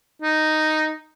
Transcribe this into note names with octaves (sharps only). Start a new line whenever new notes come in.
D#4